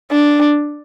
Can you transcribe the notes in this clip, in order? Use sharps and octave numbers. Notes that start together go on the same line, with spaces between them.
D4